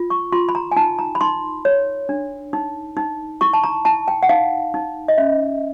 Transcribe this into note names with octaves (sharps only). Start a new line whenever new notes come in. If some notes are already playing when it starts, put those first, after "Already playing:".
Already playing: F4
C#6
F4 C6
B5
A#5
G#5
D#4 A5
A#5
B5
D#4 C6
C#5
D4
D#4
D#4
E4 C#6
A5
A#5
E4 A5
G5
F#5
D#4 F5
D#4
D#5
C#4 E5